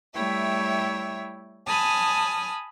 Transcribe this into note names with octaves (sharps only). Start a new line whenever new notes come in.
G3 A3 E4 C#5 E5 G5
G#5 A5 B5 D#6 F6